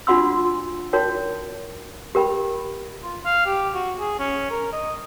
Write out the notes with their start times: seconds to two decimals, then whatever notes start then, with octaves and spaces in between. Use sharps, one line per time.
0.07 D4 F4 F#4 F#5 C6 E6
0.93 D#4 F#4 A#4 C#5 G5
2.15 G4 A#4 G5 B5
3.03 F4
3.25 F5
3.46 G4
3.75 F#4
3.99 G#4
4.19 C#4
4.51 A#4
4.73 D#5